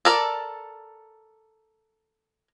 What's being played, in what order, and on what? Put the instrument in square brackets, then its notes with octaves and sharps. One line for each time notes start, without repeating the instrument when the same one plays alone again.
[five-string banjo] A4 A#4 D5